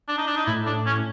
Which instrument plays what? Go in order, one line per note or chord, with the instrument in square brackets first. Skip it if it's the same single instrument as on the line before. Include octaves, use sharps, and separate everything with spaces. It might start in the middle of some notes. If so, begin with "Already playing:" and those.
[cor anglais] D4
D#4
D4
D#4
[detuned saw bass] A2 [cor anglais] E4
[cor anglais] D4
C#4